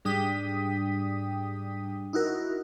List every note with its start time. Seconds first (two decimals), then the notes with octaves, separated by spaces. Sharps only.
0.05 G#2 G3 D4 G5 D#6 B6
2.13 D#4 E4 F#4 A#4